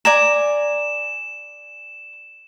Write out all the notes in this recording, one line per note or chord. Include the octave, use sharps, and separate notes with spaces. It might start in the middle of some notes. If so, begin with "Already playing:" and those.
D5 G#5 A#5 E7